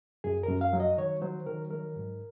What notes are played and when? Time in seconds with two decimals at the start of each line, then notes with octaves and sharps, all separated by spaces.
0.24 F#2 G#4
0.43 A#4
0.48 F#2
0.61 F5
0.73 F#3
0.80 D#5
0.98 D#3 C#5
1.22 F#3 C5
1.46 D#3 A#4
1.71 F#3 A#4
1.96 G#2